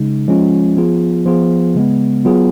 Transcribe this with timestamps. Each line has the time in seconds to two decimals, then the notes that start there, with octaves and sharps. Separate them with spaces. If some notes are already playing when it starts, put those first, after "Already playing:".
Already playing: C#3 G#3 D#4
0.28 F3 G#3 C#4 F4
0.77 F3 B3 F4 G#4
1.26 F3 B3 F4 G#4
1.75 C#3 G#3 B3
2.25 F#3 B3 F4 G#4